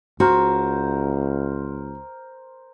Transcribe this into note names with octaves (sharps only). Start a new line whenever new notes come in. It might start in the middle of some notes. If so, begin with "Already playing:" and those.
C#2 F#4 A#4 C5